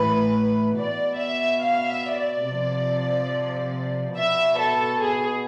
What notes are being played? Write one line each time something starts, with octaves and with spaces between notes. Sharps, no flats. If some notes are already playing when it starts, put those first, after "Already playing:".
Already playing: A2 E3 B4
B2 D5
E5
F5
E5
D5
C3 F3
B2 E5
A4
G#4